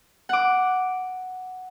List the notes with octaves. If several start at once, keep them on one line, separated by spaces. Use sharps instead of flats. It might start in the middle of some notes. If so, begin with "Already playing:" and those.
F#5 D6